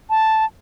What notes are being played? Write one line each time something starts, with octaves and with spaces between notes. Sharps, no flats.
A5